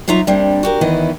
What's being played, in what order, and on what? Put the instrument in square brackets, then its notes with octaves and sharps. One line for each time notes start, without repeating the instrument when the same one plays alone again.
[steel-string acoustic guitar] F#3 D#4 F4 E5 A#5
G3 A#3 C4 D4
F#4 G4 A#4
E2 D#3 E3 B3 E4 D#5